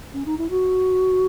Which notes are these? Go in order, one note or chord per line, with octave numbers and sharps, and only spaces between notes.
C#4
D#4
E4
F#4